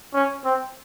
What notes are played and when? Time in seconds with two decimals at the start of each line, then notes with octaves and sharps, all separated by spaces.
0.14 C#4
0.45 C4